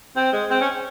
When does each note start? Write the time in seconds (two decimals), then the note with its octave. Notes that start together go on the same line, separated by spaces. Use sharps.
0.16 C4
0.33 G#3
0.50 C4
0.61 C#4